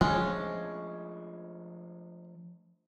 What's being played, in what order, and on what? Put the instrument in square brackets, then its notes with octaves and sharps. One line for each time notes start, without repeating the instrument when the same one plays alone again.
[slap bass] F3 A3 D4 [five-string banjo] G#3 C#4